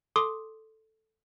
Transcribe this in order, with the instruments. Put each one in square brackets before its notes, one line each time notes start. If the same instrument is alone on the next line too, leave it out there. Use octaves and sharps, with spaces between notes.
[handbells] A4 C6 D6 D#6